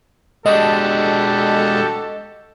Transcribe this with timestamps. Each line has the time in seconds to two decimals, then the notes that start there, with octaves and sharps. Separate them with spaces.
0.46 G#3 D4 F#4 G4 A4 D#5 A5